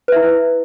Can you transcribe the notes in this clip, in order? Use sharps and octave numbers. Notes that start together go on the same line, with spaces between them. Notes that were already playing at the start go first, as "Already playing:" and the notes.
E4 B4 E5